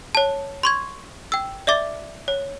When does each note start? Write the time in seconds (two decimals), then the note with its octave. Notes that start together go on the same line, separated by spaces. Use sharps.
0.15 C#5 A5
0.63 C6 C#6 G#6
1.32 G5 E6
1.67 D5 E5 D6 A6
2.28 C#5